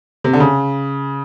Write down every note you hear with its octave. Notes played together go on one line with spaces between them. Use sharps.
C3
D3
C#3